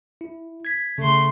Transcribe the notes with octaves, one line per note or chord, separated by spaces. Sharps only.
E4
G#6 B6
C#3 A3 C6